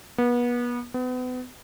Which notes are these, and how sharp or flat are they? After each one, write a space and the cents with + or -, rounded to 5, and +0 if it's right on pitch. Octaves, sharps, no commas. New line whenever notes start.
B3 -30
B3 +35